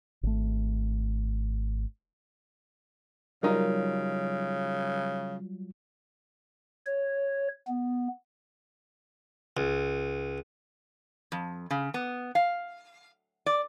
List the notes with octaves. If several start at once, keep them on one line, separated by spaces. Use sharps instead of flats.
G#1 A3
C#3 F#3 G3 D#4 F4 A#4
C#5
B3
C#2
F2
C#3
B3
F5
D5